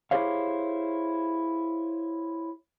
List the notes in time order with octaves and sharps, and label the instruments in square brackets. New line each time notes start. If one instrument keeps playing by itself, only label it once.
[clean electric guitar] E4 G4 G#4 C5 C#5 F5